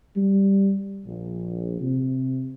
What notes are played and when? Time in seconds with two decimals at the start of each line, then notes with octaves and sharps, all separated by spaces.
0.15 G3
1.05 A#1
1.80 C3